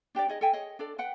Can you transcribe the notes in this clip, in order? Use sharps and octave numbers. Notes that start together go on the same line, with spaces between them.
D4 G4 B4 D5
D#4 G#4 D#5
A4 E5 G5 G#5
G#4 C#5 D#5
D4 A4 D5
B4 F#5 G5